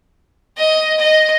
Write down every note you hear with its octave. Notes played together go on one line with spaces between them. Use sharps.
D#5
D#5